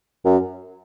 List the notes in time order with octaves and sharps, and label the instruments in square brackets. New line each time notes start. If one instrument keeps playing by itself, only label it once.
[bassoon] F#2